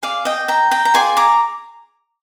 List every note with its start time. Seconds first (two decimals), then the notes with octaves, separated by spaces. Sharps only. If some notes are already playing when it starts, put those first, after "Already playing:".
0.03 G#4 D5 F5
0.25 D#5 G5
0.48 G5 A#5
0.71 G5 A#5
0.85 A#5
0.94 F4 G#4 D5 G#5 C6
1.17 A#5 D6